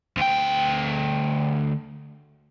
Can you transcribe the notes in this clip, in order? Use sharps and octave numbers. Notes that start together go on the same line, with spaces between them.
D2 G5